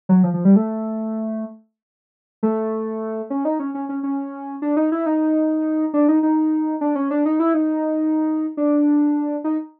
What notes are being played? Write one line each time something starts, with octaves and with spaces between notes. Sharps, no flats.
F#3
F3
F3
G3
A3
A3
C#4
D#4
C#4
C#4
C#4
C#4
D4
D#4
E4
D#4
D4
D#4
D#4
D4
C#4
D4
D#4
E4
D#4
D4
D#4